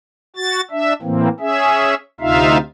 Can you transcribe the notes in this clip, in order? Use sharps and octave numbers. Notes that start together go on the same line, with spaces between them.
F#4 A6
D4 E5
A2 E3 A#3 C4
C#4 G#4 E5
D2 C3 D#4 F4 E5 F5